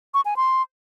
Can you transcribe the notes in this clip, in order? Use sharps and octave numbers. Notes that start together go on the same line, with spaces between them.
C#6
G#5
C6